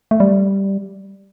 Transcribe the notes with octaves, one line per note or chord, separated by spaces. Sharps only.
A3
G3